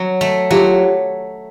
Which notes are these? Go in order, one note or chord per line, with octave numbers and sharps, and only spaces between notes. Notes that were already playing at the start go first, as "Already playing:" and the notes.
Already playing: F#3
A3
F#3 F4 G4